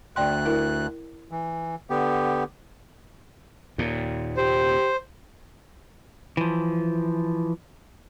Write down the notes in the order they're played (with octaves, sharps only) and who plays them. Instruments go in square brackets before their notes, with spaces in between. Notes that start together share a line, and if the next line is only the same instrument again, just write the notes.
[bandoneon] D2 F#6 [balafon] D5 G5 C6
[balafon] E4 A#4
[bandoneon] E3
D3 B3 G4
[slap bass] D#2 A#2
[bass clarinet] G4 [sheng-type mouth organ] C5
[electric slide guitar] E3 F3